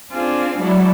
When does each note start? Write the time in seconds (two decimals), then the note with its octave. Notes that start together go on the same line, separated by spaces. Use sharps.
0.11 C4 D4 F4 G#4
0.58 F#3 G#3 D4 E4 C#5 D5